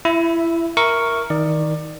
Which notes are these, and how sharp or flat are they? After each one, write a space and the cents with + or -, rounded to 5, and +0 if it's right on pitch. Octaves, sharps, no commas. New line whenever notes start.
E4 +25 E5 +0 B5 +0
A#4 +0 E5 +0 C#6 +0
D#3 +20 D5 +20